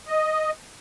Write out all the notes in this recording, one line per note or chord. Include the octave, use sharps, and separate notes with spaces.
D#5